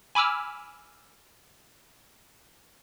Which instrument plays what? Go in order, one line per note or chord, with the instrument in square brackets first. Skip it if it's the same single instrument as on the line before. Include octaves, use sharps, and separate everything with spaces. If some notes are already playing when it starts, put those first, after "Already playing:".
[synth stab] G#5 B5 D6 E6 F6